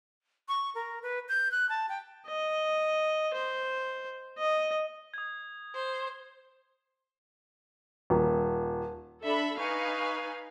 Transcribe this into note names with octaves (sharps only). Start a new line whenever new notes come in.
C#6
A#4
B4
G6
F#6
A5
G5
D#5
C5
D#5
D#6 G#6
C5
D#1
D4 A4 E5 B5
D#4 B4 F5 G#5 C#6